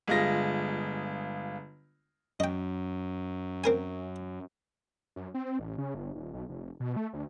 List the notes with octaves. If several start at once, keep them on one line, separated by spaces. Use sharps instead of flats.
G1 G#3 F4 A#6
F#2 D#5 G5
C4 A#4 G#5
F#2
C4
A1
C#3
G1
D#1
B1
F1
B2
A3
D2